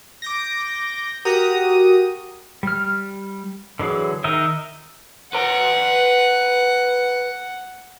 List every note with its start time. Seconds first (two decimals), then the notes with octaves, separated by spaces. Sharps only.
0.22 D6 G6 A#6
1.25 F#4 G4 A#4 A#5 D#6
2.63 G3 F6
3.79 D3 E3 F#3 G#4
4.24 D#3 D#4 A#4 D#5 E5
5.33 B4 F#5 A#5